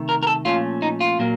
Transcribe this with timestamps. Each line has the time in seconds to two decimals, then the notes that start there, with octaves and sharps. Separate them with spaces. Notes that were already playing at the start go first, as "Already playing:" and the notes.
Already playing: C3 D#3 A3
0.09 A#4
0.23 A#4
0.27 A4
0.45 A#2 F3 A3 C#4 F4
0.82 D#4
1.01 F4
1.19 A#2 F#3 A#3